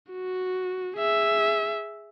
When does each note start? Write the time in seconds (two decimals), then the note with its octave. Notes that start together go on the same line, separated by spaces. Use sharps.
0.12 F#4
0.98 G#4 E5